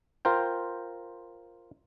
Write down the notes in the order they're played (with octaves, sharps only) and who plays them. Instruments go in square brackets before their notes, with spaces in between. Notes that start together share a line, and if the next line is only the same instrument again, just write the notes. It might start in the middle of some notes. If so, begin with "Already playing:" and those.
[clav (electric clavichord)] F4 A#4 C5 G5